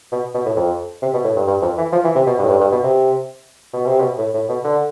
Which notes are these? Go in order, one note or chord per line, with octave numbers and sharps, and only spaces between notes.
B2
B2
A2
F2
C3
B2
A2
G2
G2
F2
E3
F3
E3
C3
B2
G2
A2
G2
G2
B2
C3
B2
C3
B2
A2
A2
B2
D3